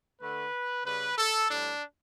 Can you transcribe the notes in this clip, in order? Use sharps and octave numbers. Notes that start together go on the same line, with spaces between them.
D3 A3 B4
C#3 G3 B4
A4
A2 G3 D4